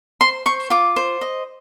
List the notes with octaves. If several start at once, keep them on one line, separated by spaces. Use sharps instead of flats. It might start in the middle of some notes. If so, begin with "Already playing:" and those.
C5 C6
C5 C#6
F4 D6
C5
D#5